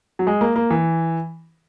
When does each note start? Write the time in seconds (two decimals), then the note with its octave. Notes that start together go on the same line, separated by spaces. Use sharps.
0.19 F#3
0.27 G#3
0.41 A#3
0.56 A#3
0.70 E3